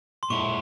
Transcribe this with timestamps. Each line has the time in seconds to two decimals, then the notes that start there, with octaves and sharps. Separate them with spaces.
0.23 C6
0.30 A#2 G#3 E4 C#6